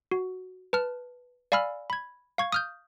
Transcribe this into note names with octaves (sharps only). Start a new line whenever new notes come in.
F#4
B4 A5 F6
D5 F5 G#5 B5 E6 F6
B5 G#6
F5 C#6 G#6
D#6 F6 G6